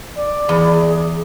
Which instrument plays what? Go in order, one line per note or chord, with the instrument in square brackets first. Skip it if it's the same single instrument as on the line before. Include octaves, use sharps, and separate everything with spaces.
[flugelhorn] D5
[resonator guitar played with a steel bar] E2 [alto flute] G#4